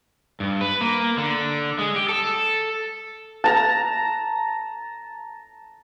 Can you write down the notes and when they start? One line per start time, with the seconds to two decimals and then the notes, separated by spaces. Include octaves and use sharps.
0.40 G2
0.61 B4
0.81 A#3
1.18 D3
1.79 G#3
1.96 G4
2.09 A4
3.44 A5 A#5